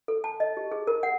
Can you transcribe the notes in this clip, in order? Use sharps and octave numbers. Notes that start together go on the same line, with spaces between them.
A4
A5
D#5
G4
G#4
A#4
F#5